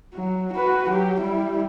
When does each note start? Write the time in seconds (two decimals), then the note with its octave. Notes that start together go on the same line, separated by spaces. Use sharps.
0.14 F#3
0.53 F#4 B4
0.90 F#3 G4
1.20 G3 E4